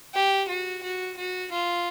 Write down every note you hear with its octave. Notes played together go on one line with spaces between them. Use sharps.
G4
F#4
F#4
F#4
F4